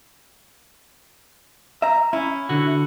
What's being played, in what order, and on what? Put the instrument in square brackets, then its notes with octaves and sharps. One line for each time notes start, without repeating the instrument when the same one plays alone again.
[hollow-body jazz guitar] E5 A#5
[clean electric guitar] C#4 [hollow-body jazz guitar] E4
[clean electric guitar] D3 F#4